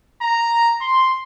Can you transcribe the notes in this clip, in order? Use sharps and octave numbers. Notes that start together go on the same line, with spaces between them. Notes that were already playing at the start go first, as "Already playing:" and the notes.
A#5
C6